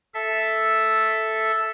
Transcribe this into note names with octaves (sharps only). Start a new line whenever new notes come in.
A4 E5